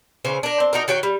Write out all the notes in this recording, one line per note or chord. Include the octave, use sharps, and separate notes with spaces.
C#3 E3 C5
D4 A#4
C4
D#4 F#4 A#4
D#3 F#4 C#5 G5
G3